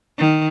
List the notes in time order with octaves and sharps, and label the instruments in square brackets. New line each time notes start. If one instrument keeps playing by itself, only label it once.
[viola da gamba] D#3